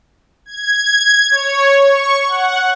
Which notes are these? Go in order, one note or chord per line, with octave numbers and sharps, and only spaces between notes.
G#6
C#5
C#6
F#5